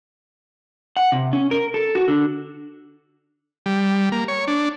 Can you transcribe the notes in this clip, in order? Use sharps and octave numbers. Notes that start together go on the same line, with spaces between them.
F#5
C3
C#4
A#4
A4
F#4
D3
G3
A#3
C#5
D4